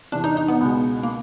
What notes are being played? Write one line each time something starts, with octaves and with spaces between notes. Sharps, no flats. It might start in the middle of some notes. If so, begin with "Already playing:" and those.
E2 C3 E3 D4
D#4
D#4
B3
C#2 B2 G#3
A#3